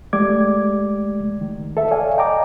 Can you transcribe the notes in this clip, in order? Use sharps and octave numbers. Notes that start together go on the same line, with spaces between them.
G#3 A3 G4 D5 D6 G#6
D#3
A4 E5
C#5 D5 F5 G#5
D#5 G5 A5 A#5 D6